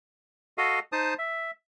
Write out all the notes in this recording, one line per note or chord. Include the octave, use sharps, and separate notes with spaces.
F#4 A4 D#5 F5
D#4 C5 A5 D#6
E5